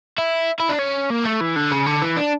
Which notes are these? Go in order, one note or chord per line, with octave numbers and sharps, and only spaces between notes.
E4
E4
D4
C#4
A#3
A3
E3
D3
C#3
D3
E3
D4